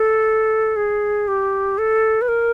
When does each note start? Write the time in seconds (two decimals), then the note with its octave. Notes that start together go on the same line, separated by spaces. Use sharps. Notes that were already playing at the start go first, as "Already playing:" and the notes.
Already playing: A4
0.76 G#4
1.28 G4
1.78 A4
2.22 B4
2.28 A#4